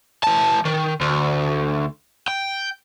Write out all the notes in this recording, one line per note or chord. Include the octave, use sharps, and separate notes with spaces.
E3 A5
D#3
D2
G5